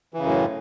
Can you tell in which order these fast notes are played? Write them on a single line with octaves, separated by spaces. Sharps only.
E3 C#3 F#2 A2